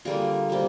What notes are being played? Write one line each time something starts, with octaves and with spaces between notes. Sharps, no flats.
D3 G3 A#3 F4 G#4
C3 G3 A#3